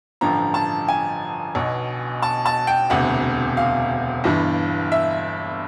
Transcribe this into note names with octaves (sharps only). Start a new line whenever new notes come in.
A1 G2 D3 F3 A#5
A5
G#5
B1 B2
A5
A5
G5
E1 D2 C3 F#5
F5
G1 G2 E3
E5